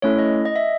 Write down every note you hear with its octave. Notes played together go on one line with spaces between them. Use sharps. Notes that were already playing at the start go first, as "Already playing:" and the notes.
A3 C#4 E4 A4 C#5
D#5
D#5
E5